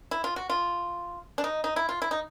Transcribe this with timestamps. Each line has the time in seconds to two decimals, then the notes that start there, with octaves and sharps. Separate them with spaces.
0.11 E4
0.24 F4
0.36 F#4
0.50 F4
1.38 D4
1.44 D#4
1.64 D#4
1.76 E4
1.89 F4
2.02 E4
2.11 D#4